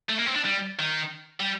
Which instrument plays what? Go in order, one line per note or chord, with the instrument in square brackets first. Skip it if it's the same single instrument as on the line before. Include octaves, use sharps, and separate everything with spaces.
[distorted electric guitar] A3
A#3
C4
D4
G3
D#3
G3